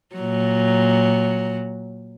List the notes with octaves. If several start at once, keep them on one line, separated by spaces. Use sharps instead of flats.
A#2 F#3